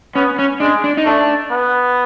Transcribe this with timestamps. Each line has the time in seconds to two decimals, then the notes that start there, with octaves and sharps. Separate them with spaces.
0.15 B3 C#4
0.39 C#4
0.60 G#3 D4
0.84 D4
0.97 D#4
1.05 A3 D4
1.51 B3